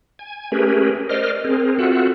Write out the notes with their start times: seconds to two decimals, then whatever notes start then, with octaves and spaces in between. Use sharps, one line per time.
0.19 G#5
0.52 A3 C#4 G4 G#4 A#4 B4
1.09 A#4 C5 D5 D#5 F6
1.45 C4 G#4 A#4
1.79 C4 F4 F#4 A4 E5 F#5